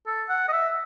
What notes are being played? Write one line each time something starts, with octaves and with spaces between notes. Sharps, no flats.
A4
F#5
D#5
E5